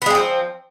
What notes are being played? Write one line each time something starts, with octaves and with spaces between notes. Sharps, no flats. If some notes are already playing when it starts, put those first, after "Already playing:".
F3 G#3 B3 C4